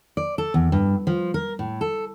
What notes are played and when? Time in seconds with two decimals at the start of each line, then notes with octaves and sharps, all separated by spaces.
0.17 D5
0.38 A4
0.54 E2
0.72 G2
1.07 F3
1.34 A#4
1.59 A2
1.81 A4